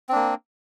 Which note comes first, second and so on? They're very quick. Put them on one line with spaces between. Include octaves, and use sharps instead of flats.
C4 D4 A#3